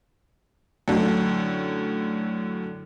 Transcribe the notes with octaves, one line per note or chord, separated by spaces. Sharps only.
F#2 A2 D3